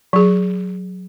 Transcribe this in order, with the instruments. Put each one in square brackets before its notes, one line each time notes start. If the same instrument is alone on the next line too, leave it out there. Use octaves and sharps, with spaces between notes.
[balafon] F#3 G#4